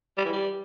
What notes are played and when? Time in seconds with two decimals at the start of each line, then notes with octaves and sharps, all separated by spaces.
0.18 G3
0.25 E3
0.33 G3